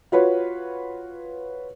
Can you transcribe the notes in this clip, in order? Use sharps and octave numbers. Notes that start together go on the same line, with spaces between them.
F4 F#4 B4 C#5